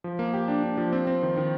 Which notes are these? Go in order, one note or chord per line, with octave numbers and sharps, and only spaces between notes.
F3
A#3
G4
D4
D4
F3
C4
C4
D#3
D#3